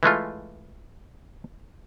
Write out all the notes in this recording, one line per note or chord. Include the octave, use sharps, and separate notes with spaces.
E3 G#3 A3 F4